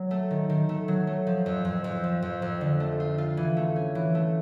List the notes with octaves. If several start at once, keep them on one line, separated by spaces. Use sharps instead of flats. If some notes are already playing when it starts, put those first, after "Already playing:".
Already playing: F#3
A3
D#3
D#3
A3
F#3
A3
F3
F2
F2
F2
F3
F2
F2
D3
A3
F4
F4
E3
A3
C#4
E3
A3